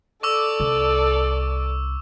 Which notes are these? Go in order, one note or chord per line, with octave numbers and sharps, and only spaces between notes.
A4 D5 C#6 D6 E6
C2